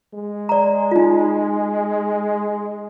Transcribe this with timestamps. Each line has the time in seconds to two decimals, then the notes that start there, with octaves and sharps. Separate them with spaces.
0.14 G#3
0.49 D5 A#5
0.91 D#4 F4